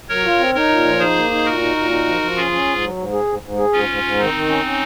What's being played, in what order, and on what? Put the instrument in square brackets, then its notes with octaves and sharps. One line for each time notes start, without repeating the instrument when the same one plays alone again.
[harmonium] F#3 [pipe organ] A#4 C#5
[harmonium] F4
C4
[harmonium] D#4 [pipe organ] A#4 C#5
[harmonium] A#2
F3
[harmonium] D#4 [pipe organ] G#4 C5
[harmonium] A#3
D#4
[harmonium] A#2 [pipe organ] F#4 A#4
[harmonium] D#4
A#2
D#4
F3
F3
[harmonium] C#4 [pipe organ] F4 G#4
[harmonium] C#4
G#2
F#3
G#2
G#4
G#2
G#2
G#4
[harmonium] G#2 [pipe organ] C#4 F4
[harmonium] G#2
G#2
[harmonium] D#3 [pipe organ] C4 D#4
[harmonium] D#3
C#4
C#4